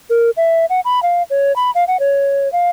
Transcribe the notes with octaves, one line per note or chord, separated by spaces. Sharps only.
A#4
E5
F#5
B5
F5
C#5
B5
F5
F#5
C#5
F5